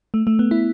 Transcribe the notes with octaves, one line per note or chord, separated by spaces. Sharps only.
A3
A3
B3
E4